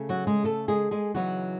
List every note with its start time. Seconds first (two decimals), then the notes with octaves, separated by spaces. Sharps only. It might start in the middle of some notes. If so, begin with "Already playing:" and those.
Already playing: C#3 A3 C#4
0.09 F#3 F#4
0.27 G#3 G#4
0.44 A3 A4
0.68 G#3 G#4
0.91 G#3 G#4
1.14 C#3 E3 F#3 B3 D#4 F#4